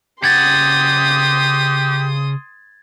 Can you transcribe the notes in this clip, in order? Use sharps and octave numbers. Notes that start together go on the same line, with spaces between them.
C#3 G4 F#5 C6 D#6 G#6 A6